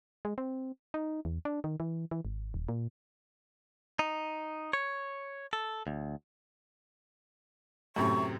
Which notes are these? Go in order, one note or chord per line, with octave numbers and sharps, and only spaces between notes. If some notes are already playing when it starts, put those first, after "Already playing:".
G#3
C4
D#4
E2
D4
D#3
E3
E3
G#1
D#1
A#2
D#4
C#5
A4
D2
F#2 A2 C3 C#6